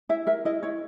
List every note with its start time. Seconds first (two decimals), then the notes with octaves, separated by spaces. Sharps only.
0.09 E4 E5
0.27 A#4 E5
0.45 E4 D#5
0.63 E4 C#5